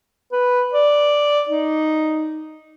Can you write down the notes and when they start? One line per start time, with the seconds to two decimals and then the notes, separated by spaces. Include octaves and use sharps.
0.32 B4
0.73 D5
1.49 D#4